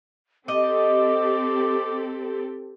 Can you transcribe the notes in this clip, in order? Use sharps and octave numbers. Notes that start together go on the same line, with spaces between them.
C4 G4 A4 D#5 D6